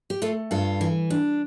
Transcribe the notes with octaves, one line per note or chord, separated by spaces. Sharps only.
G4
A3 F4 A4
G2 F4 A4
E3
D4